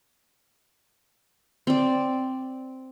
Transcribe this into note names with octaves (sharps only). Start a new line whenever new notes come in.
C4 D5